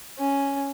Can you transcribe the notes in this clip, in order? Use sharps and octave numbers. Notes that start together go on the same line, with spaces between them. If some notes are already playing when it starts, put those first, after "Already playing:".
C#4